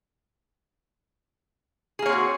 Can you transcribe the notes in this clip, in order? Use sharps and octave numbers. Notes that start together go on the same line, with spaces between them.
A#3 C4 F#4 G#4 C#5